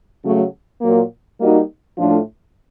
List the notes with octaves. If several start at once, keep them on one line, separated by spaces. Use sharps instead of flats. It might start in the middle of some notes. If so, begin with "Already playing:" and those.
C#3 F#3 A3
A#2 F#3 A#3
G3 A#3 D#4 F#4
A2 F3 A3 D4 F4